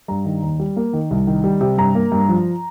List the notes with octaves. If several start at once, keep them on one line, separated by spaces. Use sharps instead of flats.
G2 A#5
D#3
D#2
G3
A#3
D#3
C2
D#3
G3
C3
G2 A#5
A#3
G2
F3